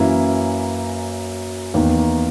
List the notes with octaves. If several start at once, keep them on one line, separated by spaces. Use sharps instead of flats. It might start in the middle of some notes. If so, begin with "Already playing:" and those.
Already playing: F#2 E3 A#3 C#4 E4
E2 D#3 A#3